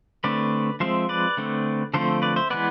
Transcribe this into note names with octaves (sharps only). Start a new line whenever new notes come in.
D3 A3 C4 B4 D5
F3 G#3 C4 C5 E5
B4 D5
D3 A3 C4
D3 F3 A3 C4 A4 C5
B4 D5
C5 E5
E3 G#3 B3 B4 D5